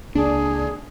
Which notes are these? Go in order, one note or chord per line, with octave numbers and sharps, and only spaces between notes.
C#2 A#3 D4 G#4